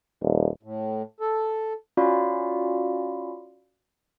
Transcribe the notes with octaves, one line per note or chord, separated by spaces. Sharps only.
D#1
A2
A4
C#4 F4 F#4 D5 F5 B5